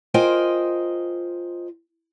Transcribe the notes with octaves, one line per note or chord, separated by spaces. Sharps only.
F4 A#4 C5 D#5 G5 G#5